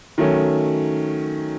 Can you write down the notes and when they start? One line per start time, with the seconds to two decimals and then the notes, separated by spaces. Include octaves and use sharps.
0.18 D#3 F#3 A3 C#4